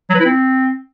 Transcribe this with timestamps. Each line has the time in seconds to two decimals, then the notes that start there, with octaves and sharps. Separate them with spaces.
0.10 F#3
0.15 B4
0.20 E4
0.25 C4